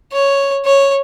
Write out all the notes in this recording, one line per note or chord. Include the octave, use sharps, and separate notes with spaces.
C#5
C#5